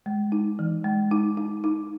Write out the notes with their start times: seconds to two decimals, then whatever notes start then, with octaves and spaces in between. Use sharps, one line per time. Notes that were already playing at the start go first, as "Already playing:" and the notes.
0.06 G#3
0.32 D#4
0.59 E3
0.84 G#3
1.11 D#4
1.37 D#4
1.64 D#4